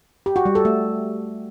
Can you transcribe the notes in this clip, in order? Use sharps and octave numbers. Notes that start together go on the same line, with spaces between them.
G4
F#4
G3
A4
A3